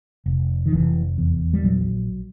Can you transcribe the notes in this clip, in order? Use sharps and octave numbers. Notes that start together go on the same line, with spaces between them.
F1
D#3
F1 E3
E2
G3
A#1 F#3